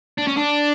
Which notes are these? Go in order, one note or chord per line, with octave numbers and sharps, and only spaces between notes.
D4
C#4
D4